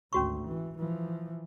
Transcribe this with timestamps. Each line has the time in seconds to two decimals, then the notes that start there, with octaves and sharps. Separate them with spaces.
0.13 G#1 D2 C#4 F#4 C#6
0.48 E3
0.78 E3 F3